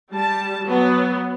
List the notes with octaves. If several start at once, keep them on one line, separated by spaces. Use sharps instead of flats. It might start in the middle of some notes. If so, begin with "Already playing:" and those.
G3 A5
F#3 B3